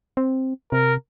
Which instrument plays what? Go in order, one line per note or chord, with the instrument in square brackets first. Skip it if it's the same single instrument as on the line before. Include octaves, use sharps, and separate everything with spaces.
[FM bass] C4
[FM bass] C3 [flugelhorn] A#4